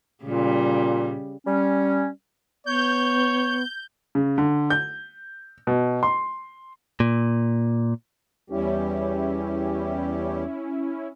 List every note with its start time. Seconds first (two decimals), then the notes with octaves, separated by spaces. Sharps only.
0.23 A#2 C#3 G3
1.46 G3 C#4
2.66 B3 C#5 G6
4.15 C#3
4.38 D3
4.70 G6
5.67 B2
6.03 C6
7.00 A#2
8.50 E2 G3 C#4 E4 G4